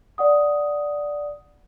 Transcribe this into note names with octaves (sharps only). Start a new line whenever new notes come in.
D5 F#5 D#6